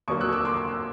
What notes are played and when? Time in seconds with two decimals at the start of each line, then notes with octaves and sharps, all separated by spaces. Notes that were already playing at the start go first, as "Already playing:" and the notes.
0.08 D#2 D3 F#3 A#3 C#6 D#6
0.21 E6 F#6
0.33 D6 E6
0.45 C6 D6